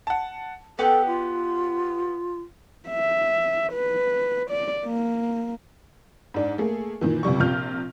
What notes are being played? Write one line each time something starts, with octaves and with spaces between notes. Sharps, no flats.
F#5 A5
B3 G4 A4 D5 F#5
F4
E5
B4
D5
A#3
G#2 D4
A3 A#3 G#4
A#2 D#3 E3
C#2 C3 G3 C#6
A#1 C3 F4 F6 G6